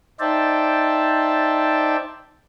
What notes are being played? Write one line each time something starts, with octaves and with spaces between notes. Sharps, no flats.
D#4 C5 D5 E5 G5 A5